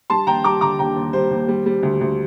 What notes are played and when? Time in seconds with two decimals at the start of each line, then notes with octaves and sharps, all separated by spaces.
0.10 G3 A5 C6
0.27 D#2 G5 A#5
0.44 G3 A#5 D6
0.61 D3 A#5 D6
0.79 D#2 G5 A#5
0.96 D#2
1.13 G3 C5
1.31 D#2
1.48 G3
1.66 G3
1.83 D2
2.01 D2